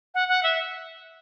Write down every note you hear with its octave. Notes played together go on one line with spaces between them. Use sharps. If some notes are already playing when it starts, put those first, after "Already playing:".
F#5
F#5
E5